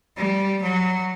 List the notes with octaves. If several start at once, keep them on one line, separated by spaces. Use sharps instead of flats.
G3
F#3